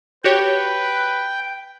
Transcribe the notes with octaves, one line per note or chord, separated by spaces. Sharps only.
F#4 G4 B4 C#5 G5